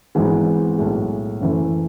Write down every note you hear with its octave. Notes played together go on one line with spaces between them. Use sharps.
G#1 G#2 E3 G#3 B3
B1 A2 G#3
F#1 F#2 E3 A3